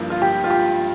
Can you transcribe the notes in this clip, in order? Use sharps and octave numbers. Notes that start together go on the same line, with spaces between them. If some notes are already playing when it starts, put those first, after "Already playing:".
Already playing: G2 F3 A#3 E4
F4
G4
F4
G4